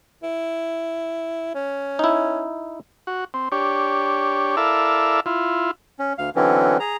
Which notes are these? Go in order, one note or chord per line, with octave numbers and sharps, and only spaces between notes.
E4
C#4
D#4 E4
F#4
C4
D4 G4 C#5
E4 A4 A#4 D5 E5 F5
E4 F4
C#4
D2 F5
D3 E3 F#3 C4 C#4
G#4 A#5